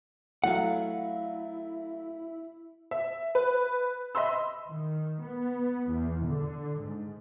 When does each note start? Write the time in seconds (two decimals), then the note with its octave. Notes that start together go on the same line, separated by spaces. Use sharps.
0.44 F#3 A3 E4 F5 F#5
2.91 E5
3.35 B4
4.15 D#5 E5 B5 C6 E6
4.70 D#3
5.23 B3
5.91 E2
6.25 D3
6.82 G#2